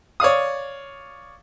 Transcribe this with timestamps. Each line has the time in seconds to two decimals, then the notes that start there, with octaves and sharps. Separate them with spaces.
0.20 C#5 D5 F5 D#6